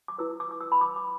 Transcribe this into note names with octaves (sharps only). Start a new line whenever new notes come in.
D6
E4 B4 E6
D6
D6
E6
B5
D6
D6